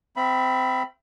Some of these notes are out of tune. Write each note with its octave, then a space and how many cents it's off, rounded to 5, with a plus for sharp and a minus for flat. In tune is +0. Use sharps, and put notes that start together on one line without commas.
C4 -20 E5 +35 B5 +0